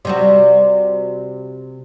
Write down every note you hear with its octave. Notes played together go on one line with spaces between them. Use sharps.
C3 G3 F#4